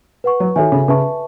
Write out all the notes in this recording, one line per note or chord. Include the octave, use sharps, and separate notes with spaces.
B4 F#5 C#6
F#3
D#3 F#4 A4 C#5 E5 G#5
C#3
C#3 B4 E5 A5 C#6